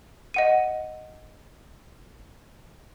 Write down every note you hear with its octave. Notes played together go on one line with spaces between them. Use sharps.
D#5 F#5 D#7